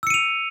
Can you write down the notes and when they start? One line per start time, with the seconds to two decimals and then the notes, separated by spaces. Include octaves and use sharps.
0.03 E6
0.07 C#7
0.10 D#7
0.14 F7